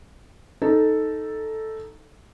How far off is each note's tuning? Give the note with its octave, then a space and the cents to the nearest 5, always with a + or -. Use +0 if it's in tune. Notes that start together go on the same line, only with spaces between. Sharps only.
D#4 +0 A4 +0